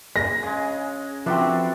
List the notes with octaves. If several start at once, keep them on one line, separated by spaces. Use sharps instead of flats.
G#4 A#6
C#3 G#3
F3 C4 D4 F#4 A4 B4 E5